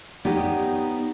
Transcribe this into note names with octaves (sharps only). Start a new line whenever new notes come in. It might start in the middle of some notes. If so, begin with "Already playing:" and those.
B3 D#4 G4 C#5 D5